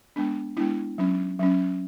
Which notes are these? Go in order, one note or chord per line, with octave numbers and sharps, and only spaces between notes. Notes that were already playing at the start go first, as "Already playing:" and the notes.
G#3 B3 D4
G#3 B3 D4 E4
F#3 C#4
F#3 C#4